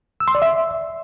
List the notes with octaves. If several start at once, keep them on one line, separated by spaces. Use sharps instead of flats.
E6
C6
D5
E5